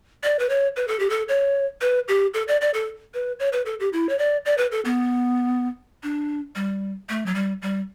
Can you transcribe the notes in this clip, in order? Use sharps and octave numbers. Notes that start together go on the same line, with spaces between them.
D5
B4
C#5
B4
A4
G4
A4
C#5
B4
G4
A4
D5
D5
A4
B4
C#5
B4
A4
G4
E4
C#5
D5
D5
B4
A4
B3
D4
G3
A3
F#3
G3
G3